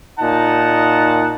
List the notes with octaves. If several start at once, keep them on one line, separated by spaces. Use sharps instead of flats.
A#2 D#4 F#5 A5